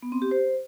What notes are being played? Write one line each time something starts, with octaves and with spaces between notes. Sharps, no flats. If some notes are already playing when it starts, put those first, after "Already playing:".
B3
C4
G4
C5